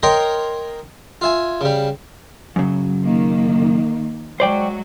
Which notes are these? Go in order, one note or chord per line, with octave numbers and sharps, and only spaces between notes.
A#4 C#5 D#5 G5 A#5 C6
F4 E5 G#5
C#3 G3
F#2 C#3 F#3
D#3 A#3
F#3 G#3 F#4 C5 D5 G5